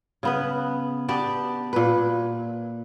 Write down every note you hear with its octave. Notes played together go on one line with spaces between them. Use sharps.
C#3 B3 B4
B3 D4 G4 D5
A#2 B4